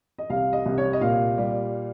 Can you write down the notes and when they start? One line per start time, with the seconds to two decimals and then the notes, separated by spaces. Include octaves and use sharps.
0.18 D#5
0.30 C2 F5
0.53 D#5
0.66 C2
0.78 C#5
0.93 D#5
1.01 A#2 F5
1.38 G3